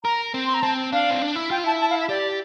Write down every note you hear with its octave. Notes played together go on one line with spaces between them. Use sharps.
A#4 A#5
C4
C6
A#5
C4 A5
D4 F5
C4
D4
E4
F4 G5
E4 A5
A5
F5
E5
G4 D5